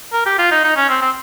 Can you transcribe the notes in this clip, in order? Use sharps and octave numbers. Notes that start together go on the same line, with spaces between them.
A#4
G4
F4
D#4
D#4
C#4
C4
C4